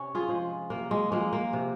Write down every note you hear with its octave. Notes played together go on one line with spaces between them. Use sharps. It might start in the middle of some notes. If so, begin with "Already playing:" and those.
Already playing: C3 C#4
F4 G#4
F3 G#3
C3 A#3
G#3
F3 G#3 A#3
A#3
C3